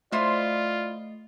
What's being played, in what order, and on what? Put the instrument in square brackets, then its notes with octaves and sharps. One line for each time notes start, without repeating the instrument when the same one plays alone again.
[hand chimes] A3 D#5 [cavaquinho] E4 C5 D#6 [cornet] F4 [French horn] D5